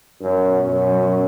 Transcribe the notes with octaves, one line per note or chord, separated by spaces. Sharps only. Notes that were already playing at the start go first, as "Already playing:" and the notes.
F#2 B2 F#3 C#4
F#2